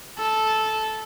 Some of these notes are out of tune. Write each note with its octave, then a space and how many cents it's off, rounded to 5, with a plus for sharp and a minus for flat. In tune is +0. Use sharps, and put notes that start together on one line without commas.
A4 -10